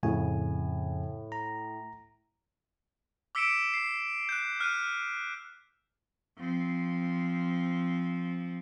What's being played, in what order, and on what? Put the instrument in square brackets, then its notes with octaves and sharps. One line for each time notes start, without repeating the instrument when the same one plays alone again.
[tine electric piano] F2 C#3 G#5 [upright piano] A2
[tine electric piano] A#5
[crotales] D6 E6 B6 C#7 D7 E7
C7
F#6 G6
F6 F#6 D#7
[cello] F3 C4